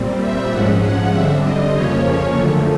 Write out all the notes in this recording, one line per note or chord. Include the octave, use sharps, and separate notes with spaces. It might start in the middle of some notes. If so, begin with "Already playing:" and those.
Already playing: A#2 G3 C4
E5
G#2 F3 G#3 C#4 F#5
F#5
D3 G3 C4 E5
D#5
F2 C#3 F3 A#3 C#4 C#5
F#2 D3 F3 A3